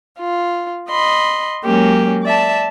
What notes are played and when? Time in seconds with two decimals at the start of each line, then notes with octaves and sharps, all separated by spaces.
0.18 F4
0.90 D#5 B5 C6
1.64 F#3 G#3 A#3 C#4 G4
2.24 D5 E5 A5